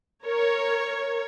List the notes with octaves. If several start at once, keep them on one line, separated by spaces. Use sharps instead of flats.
A#4 C#5